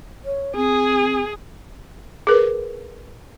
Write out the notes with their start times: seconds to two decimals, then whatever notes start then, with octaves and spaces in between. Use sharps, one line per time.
0.25 C#5
0.56 C4 G#4
2.27 G#4 A#4 B4